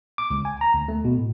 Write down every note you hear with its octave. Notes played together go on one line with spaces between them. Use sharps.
D6
C#2
G#5
A#5
D2
A3
B2
A2